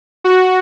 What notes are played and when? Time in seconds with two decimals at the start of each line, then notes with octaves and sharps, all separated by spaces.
0.24 F#4